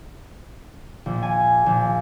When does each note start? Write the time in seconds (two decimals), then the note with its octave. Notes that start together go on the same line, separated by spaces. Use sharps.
1.06 A#1
1.23 G#5
1.66 A#1